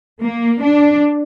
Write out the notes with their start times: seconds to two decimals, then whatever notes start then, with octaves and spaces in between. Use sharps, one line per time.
0.21 A#3
0.62 D4